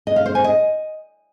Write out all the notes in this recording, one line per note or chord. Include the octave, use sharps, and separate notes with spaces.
D#5
F5
C5
G#5
D#5